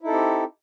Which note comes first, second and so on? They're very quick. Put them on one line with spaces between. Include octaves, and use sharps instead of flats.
E4 D#4 A4 C4 G4